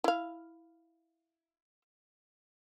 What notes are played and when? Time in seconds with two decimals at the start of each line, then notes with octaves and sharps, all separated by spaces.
0.04 E4 F5